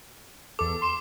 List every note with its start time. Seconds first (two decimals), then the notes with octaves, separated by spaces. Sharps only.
0.59 E2 A4 D6
0.82 C6 E7